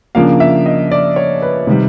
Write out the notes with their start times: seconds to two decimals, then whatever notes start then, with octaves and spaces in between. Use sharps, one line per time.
0.15 C#3 F3 A#3 D4 F5
0.40 E5
0.66 D#5
0.91 D5
1.16 C#5
1.42 B4
1.67 C3 D#3 G3